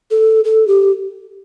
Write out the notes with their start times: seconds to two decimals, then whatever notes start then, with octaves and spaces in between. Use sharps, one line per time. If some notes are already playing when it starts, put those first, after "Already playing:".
0.11 A4
0.44 A4
0.68 G4